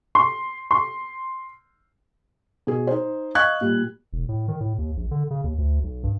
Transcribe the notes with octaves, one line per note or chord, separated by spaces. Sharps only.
C6
C6
B2 G#4
D#4 C5
D#5 F5 C#6 F#6 G#6
A#2 G3
E1
A2
D#3
A2
D#2
A#1
D3
C#3
D#2
D2
B1
G2